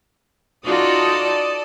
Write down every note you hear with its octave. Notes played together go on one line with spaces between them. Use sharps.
D#4 F4 F#4 A4 D5 D#6